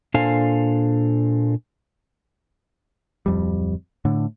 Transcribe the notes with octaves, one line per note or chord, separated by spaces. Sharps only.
A#2 D4 A4 C5 F5 G#5
D1 F2 G3
A2 D3